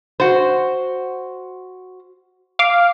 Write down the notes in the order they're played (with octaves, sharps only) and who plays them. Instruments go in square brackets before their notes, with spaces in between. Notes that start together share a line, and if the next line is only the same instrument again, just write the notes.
[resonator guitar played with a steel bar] F#4 C5
[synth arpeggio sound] F5 D6